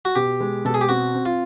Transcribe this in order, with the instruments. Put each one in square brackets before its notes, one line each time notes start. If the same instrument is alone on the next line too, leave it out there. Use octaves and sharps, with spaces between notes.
[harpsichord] F#4
[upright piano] B2 [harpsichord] G4
[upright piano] G#3
[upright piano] B2 [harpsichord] A4
[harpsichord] G#4
G4
[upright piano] C4 [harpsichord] F#4
[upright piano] C4
[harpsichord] F4